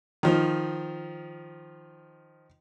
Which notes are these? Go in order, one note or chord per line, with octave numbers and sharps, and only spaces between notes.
D#3 F3